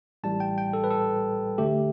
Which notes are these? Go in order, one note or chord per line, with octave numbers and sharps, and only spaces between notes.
A1 A2 G3 A5
G5
G5
A4
B4
A4
D2 D3 A3 G4